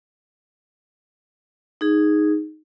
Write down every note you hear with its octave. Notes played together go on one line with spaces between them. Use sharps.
D#4 G#4